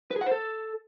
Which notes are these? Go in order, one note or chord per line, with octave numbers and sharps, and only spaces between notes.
B4
G#4
F#5
C5
A4